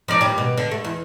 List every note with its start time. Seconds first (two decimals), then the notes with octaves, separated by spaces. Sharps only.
0.08 F3 D#4 D5
0.21 D#2 G3
0.38 B2
0.58 D3
0.71 A3
0.84 E2